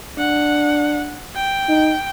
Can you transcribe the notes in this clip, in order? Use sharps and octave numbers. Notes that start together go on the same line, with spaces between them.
D4 F#5
G5
D#4